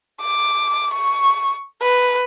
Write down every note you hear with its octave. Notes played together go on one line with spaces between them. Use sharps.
D6
C#6
B4